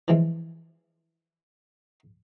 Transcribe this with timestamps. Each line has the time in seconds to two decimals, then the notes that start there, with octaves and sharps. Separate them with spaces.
0.08 E3 F3 G#3 C4